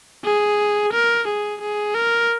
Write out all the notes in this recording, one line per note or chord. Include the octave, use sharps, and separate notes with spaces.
G#4
A#4
G#4
G#4
A#4